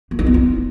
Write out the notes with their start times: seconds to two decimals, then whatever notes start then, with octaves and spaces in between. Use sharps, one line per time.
0.11 A#3
0.19 D#4
0.26 B3
0.34 F4